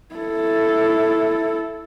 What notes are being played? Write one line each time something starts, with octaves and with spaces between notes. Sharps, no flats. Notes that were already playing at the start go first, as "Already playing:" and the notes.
E4 A4